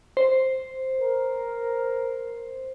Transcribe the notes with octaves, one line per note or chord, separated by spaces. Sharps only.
C5
A#4